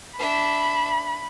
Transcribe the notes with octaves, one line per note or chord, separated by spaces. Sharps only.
D4 E5 B5